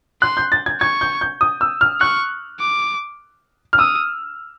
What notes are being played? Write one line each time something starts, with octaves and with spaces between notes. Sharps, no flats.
C6 F#6
G6
A6
G#6
C#6 G#6
G6
G6
D#6
E6
F6
C#6 F#6
D6
F6
D#6 E6